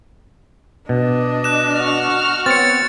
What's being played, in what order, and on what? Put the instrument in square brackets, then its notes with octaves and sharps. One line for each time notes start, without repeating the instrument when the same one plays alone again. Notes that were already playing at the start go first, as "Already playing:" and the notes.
[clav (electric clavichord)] B2 [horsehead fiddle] D4 D#5
[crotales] F#6 E7
[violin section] F#4 F6
[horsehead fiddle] B3 C#5 [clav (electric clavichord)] C4 [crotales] A6 C#7